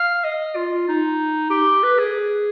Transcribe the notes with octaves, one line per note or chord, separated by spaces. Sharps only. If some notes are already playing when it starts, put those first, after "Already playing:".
Already playing: F5
D#5
F4
D#4
G4
B4
G#4